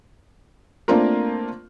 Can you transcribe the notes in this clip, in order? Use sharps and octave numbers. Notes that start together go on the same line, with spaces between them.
A3 A#3 C4 D4 F4 A#4